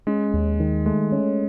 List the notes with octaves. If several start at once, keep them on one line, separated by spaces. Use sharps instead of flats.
G#3 C#4
D#2
D#3
G#3 A3
C#4